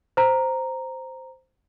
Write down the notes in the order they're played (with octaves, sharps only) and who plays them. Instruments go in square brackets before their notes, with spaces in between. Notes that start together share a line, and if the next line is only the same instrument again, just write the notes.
[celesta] C5 A#5